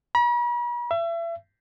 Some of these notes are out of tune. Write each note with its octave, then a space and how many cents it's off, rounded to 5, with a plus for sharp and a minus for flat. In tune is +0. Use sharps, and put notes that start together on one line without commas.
B5 -45
E5 +35